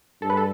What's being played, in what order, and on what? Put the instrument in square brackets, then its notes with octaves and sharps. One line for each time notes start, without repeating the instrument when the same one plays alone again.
[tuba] G2 [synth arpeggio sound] A4
[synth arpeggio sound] B4
A4